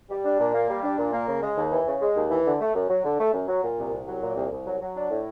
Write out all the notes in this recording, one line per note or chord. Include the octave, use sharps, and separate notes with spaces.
G3
D4
A#2
A#3
G3
D4
A#2
A#3
C#3
G#3
D#2
E3
C#3
G#3
D#2
E3
D3
A3
F#2
F#3
D3
A3
F#2
F#3
A#2
C2
C2
F#3
A#2
C2
C2
F#3
F#3
D4
A2